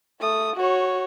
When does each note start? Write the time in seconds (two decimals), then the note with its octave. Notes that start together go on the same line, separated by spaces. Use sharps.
0.20 A3 D#6
0.56 F#4 C#5